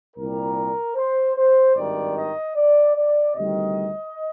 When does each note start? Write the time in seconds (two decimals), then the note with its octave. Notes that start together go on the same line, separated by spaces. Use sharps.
0.15 C2 A#2 G3 A#4
0.95 C5
1.36 C5
1.75 G#1 G2 D#3 D5
2.15 D#5
2.55 D5
2.95 D5
3.35 D2 C3 D#3 G3 D#5